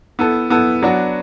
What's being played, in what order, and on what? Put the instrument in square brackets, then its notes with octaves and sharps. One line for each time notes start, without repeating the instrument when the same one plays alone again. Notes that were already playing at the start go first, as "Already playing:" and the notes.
[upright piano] B3 E4 A4
B3 E4 A4
F#3 B3 D4 F#4